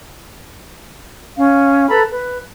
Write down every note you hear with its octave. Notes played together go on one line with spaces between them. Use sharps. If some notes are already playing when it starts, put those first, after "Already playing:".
C#4 F5
A4 B4 A#5 B5
B4